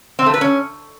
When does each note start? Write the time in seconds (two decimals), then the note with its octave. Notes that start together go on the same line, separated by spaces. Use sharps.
0.19 C4
0.26 A3
0.34 B4
0.41 C#4